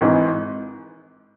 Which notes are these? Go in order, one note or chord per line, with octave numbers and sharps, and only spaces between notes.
G#1 G#2 E3